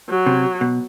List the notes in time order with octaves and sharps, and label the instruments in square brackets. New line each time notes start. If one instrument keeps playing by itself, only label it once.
[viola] F#3
[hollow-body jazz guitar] C3
B2